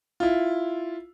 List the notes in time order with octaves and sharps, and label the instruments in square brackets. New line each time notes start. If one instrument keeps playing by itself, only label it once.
[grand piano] E4 F4